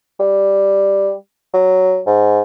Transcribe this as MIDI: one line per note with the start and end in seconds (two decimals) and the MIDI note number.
0.20 1.13 55
1.54 2.00 54
2.07 2.42 44